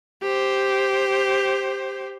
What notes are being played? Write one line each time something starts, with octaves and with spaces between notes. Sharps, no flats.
G4 C5